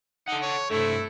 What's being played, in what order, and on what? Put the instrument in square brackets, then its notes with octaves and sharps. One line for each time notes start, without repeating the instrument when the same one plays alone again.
[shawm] D#4 [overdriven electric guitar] A4 F#5
[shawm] C#5
[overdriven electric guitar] G2 C3 [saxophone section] A3 [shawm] E4